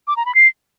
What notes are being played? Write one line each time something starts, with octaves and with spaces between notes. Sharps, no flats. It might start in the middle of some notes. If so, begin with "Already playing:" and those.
D6
A#5
B5
C7